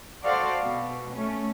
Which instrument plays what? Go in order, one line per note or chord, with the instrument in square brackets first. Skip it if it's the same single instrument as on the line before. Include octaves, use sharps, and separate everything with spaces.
[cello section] F#4 A4 C5 D5 F5
B2
A3 C#4